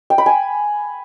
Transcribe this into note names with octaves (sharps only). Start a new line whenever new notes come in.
G5
B5
G#5